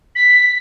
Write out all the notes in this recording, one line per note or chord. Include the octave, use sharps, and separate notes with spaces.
B6